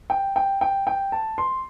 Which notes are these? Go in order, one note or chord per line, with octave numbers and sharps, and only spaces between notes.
G5
G5
G5
G5
A5
C6